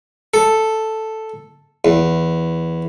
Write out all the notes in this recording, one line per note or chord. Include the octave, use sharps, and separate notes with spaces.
A4
E2